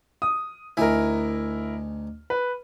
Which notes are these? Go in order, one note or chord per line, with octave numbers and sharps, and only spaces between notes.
D#6
D2 D#4 E4 A#4 G#5
B4